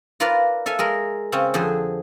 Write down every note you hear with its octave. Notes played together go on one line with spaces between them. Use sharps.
F4 A#4 B4 D5 F5
A4 E5 F5 G#5
G#3 G#4 A#4
C#3 C4 C#4
F2 D3 G#4 C5